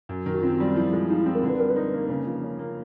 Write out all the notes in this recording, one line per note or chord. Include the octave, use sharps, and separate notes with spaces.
F#2
D#3
F#4
C4 F4
G3
F3 E4
G#3
F3 D#4
E4
C4
A#4
D3
B4
G3 A#4
B4
D#4 A#4
A#3
C#3
F3
C#4
A#3